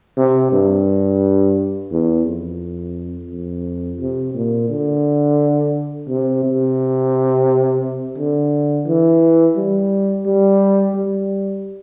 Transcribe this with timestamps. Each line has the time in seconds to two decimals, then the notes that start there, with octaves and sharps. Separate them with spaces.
0.17 C3
0.52 G2
1.92 E2
2.26 F2
3.30 F2
4.00 C3
4.34 A#2
4.69 D3
6.09 C3
6.44 C3
8.17 D3
8.86 E3
9.56 G3
10.26 G3
10.95 G3